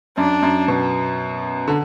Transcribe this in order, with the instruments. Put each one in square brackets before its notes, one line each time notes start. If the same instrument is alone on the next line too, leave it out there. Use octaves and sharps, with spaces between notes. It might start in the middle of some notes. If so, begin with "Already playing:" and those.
[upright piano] F#2 [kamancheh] D4
[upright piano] F#2
B2
D3